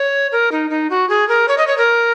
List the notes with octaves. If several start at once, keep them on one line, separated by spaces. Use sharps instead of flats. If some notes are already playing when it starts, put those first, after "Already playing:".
Already playing: C#5
A#4
D#4
D#4
F#4
G#4
A#4
C#5
D#5
C#5
A#4